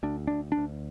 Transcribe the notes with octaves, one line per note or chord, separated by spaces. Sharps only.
D2 D4
D2 D4
D4
D2